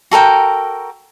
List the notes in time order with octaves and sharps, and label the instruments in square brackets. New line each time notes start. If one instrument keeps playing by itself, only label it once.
[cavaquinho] F#4 A4 A#4 G5